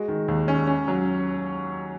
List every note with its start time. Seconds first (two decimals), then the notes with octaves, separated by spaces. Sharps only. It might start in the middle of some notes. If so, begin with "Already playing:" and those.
Already playing: G#3 F#4
0.08 D#3
0.28 D#2
0.48 C#4
0.67 C#4
0.88 F#3